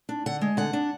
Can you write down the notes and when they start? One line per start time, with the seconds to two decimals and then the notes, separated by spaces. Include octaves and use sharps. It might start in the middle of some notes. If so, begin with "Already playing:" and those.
0.09 D4
0.26 D3 F#5
0.41 G#3
0.57 D3 F#5
0.73 D4